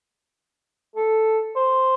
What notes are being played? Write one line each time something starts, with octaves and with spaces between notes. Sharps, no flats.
A4
C5